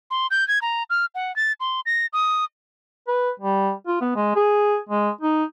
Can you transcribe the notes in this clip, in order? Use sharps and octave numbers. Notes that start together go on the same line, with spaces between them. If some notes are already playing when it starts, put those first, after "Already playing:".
C6
G6
G#6
A#5
F6
F#5
A6
C6
A#6
D#6
B4
G3
F4
B3
G#3
G#4
G#3
D#4